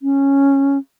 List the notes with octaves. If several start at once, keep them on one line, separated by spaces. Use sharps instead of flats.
C#4